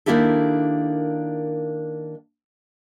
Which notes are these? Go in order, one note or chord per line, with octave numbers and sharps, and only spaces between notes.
D#3 A#3 D4 E4 G4 A4